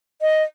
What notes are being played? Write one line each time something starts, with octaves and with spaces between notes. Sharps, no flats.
D#5